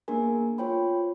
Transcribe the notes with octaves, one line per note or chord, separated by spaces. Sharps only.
A#3 B3 D4 G#4 A#4 G#5
B3 F4 C5 C#5 G5 B5